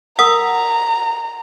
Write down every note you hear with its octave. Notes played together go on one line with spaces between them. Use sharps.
A#4 F#5 A#5 D#6